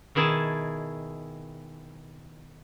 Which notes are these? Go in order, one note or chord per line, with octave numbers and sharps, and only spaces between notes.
B2 D#3 E4 G#4 A5